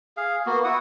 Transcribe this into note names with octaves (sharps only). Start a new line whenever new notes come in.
G#4 F5
A#3 B3 F#4
E4 F#4 F#5 D#6